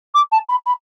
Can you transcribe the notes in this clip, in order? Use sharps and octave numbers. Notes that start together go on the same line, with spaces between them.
D6
A5
B5
B5